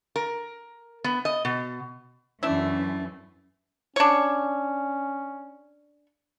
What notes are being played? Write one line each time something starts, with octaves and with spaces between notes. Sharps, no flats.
A#4
B3
D#5
B2
F#2 E3 A3 C#4 D4 E4
C#4 D4 C#5